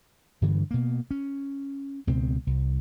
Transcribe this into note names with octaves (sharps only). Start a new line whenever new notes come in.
G2 D3 E3
B2 A#3
C#4
C#2 B2 C4
C2